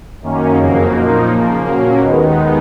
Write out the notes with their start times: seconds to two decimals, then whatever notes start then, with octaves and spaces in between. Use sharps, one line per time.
0.22 F#2 D#3 A#3 C#4
0.57 F2 C#3 F#3 A#3
0.93 A#2 F3 A#3 D#4
1.28 C#3 F3 A#3
1.64 A#2 F#3 A#3 C#4
2.00 D#2 D#3 G#3 B3 D#4